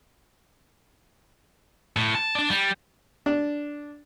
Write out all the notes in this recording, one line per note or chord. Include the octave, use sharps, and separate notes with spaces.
A2
A5
D4 D5
G3
D4